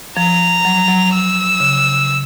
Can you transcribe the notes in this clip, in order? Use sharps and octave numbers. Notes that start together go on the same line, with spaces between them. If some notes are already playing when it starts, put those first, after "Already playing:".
F3 A#5
F#3
F#3
E6
C#3